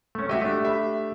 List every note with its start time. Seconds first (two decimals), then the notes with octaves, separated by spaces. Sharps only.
0.15 A3 C#4
0.29 F#4 G4 D#5 E5
0.42 A3 D4
0.63 G4 E5 B5